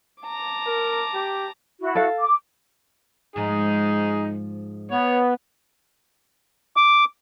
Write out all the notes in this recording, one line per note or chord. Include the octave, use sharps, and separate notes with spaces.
A5 A#5 D6
A#4
G4
E4 F#4
A4 F5
D6
G#2 F3 G#3 D#4 G#4
B3 C#5
D6